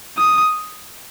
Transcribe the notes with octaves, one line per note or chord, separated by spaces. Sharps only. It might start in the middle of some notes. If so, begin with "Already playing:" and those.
D#6